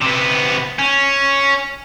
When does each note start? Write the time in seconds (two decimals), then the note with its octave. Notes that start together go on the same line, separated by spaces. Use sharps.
0.01 C3 B3
0.79 C#4